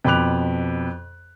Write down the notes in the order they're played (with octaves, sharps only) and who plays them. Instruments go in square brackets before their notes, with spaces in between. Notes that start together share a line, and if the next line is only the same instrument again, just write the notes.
[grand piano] F2 B2 B5 D6 F#6 F7